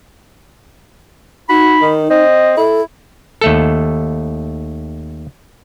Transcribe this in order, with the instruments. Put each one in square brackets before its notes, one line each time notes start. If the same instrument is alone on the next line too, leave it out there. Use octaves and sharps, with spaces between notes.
[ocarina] D#4 [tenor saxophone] F#4 [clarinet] B5
[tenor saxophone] D#3
[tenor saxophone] C4 [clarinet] D#5
[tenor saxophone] E4 [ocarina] A4
[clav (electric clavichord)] D#2 A3 A4